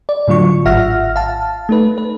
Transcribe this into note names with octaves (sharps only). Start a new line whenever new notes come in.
D5
A2 D3 F#3 F4 C#6
G#1 F4 E5 F#5 F6 A#6
F5 A5
A3 D#4 B4
B4